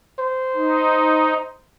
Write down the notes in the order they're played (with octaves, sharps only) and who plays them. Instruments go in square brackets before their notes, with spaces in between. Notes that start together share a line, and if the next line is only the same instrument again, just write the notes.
[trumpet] C5
[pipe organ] D#4